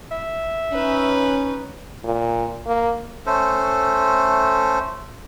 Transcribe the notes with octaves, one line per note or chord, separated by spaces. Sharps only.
E5
C#4 D#4 B4
A#2
A#3
A3 C#4 A4 C5